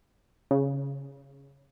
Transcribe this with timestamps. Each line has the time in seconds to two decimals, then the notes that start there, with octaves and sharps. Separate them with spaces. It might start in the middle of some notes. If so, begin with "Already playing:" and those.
0.51 C#3